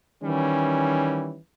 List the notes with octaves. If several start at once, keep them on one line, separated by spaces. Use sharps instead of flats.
D#3 E3 G3 C#4